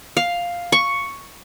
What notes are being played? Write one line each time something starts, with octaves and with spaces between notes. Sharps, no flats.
F5
C#6